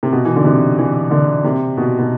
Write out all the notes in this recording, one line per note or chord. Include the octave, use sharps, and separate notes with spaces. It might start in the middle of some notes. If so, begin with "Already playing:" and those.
C3
B2
E3
D3
C3
E3
D3
C3
B2
B2